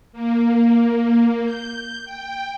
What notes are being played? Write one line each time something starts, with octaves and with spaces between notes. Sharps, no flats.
A#3
G6
G5